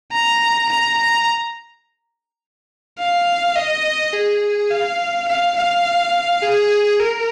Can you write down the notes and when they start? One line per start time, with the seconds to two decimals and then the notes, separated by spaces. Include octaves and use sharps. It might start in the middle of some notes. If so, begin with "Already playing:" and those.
0.12 A#5
0.69 A#5
0.97 A#5
2.99 F5
3.56 D#5
4.13 G#4
4.70 F5
5.28 F5
5.56 F5
6.43 G#4
6.99 A#4